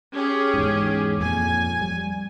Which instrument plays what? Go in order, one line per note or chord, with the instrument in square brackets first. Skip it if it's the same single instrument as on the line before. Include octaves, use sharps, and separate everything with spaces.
[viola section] C#4 G4 G#4
[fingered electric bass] E2 G#2
[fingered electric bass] F2 A#2 [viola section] G#5
[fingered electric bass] G3